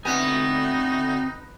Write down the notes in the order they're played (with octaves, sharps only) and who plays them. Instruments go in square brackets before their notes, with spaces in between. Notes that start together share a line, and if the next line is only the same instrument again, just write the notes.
[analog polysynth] D3 E4 F#4 [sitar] B3 [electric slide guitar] C4 G#5 [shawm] D#4